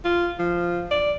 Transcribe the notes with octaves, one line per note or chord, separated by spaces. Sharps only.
F4
F3
D5